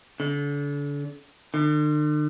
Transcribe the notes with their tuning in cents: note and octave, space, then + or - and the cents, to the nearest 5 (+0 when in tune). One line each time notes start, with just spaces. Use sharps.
D3 -35
D3 +45